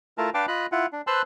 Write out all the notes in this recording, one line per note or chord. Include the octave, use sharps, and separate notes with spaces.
A3 E4 F4 A#4 A5
D4 B4 F5 G5 A5 D6
F4 D#5 B5 F#6
E4 F4 F#5
D4
B4 C5 A5 C6 E6 F#6